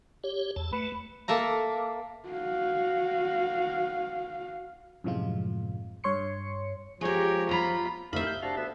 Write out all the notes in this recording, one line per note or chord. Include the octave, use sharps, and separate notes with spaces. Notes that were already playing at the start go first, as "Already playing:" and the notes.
G4 C#5
E2 A5
A3 B4
A#3 A4 E5 A#5
F#4 F5
F#2 A2 C3 F3 G#3 F4
G2 C#5 C6 C#7
F3 G#3 G4 A#4 C#5
F#3 F4 A#5 B5
C2 F2 A3 D#4 E5 F5 B5
G6
C3 D4 F#4 F5 A5
D2 B3 E5